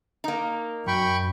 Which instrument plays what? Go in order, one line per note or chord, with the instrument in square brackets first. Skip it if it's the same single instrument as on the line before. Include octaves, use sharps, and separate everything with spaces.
[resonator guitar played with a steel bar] A#3 D#4
[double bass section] F#2 [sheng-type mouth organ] G5 B5 C#6